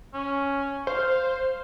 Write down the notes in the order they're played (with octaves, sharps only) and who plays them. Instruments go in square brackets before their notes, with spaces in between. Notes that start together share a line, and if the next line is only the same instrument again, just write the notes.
[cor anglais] C#4
[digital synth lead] C5 [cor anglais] F5